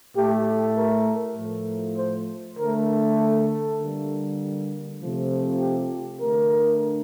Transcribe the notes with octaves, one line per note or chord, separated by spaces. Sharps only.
A2 A3 G4
A#4
A2 F3 A3
C5
D3 A3 A#4
A4
D3 G3 A#3
C3 F3 A3
G4
D3 A3 A#4